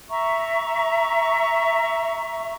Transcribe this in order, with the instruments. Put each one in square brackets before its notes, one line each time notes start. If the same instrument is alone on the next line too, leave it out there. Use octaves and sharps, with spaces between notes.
[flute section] E5 A#5 C#6